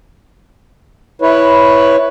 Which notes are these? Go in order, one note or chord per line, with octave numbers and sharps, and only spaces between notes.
E4 B4 C#5